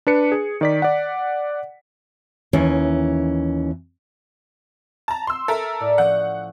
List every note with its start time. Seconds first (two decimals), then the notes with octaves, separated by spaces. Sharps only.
0.07 D4 B4 C#7
0.32 G#4
0.61 D#3 D5 B6
0.82 D5 F#5
2.53 D#2 E3 C#4
5.08 A5 A#5
5.27 C6 E6
5.48 A4 A#4 E5
5.80 A2 D5
5.98 F3 C#4 F#5 G6